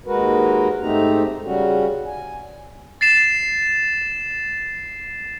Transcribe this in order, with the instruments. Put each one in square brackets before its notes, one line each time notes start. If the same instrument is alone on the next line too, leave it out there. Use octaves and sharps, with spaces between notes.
[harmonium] D#2 G#3 F#4 A#4 B4
G#2 A3 C4 D#4 G4 A#5
C#3 G3 C#4 F#4
G#5
[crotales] A6 C7 E7